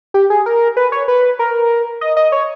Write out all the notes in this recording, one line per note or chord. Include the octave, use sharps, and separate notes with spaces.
G4
G#4
A#4
B4
C#5
B4
A#4
D#5
D#5
C#5